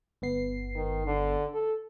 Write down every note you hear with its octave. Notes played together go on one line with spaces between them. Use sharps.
G1 B3 C7
D#3
D3
A4